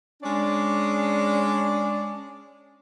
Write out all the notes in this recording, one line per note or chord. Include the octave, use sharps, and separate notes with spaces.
G#3 C#4 D4 D5